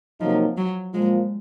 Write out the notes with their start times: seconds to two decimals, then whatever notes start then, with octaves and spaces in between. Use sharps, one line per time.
0.20 C3 F3 F#3 A#3 D#4
0.57 F#3
0.94 A#2 F3 G#3 A#3 F4